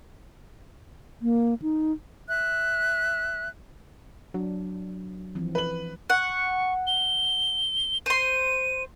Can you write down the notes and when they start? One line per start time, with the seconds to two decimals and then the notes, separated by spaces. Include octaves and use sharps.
1.22 A#3
1.62 D#4
2.28 E5 F#6
4.34 F#3 D4
5.35 E3 F3 C4
5.55 B4 F#7
6.10 F#5 C#6
6.87 G7
8.06 C5 C6 D#7